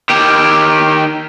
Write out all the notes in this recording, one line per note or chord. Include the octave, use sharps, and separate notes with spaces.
D#3 G4